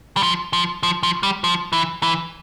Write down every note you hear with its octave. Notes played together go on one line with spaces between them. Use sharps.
G3
F3
F3
F3
F3
G3
F3
E3
E3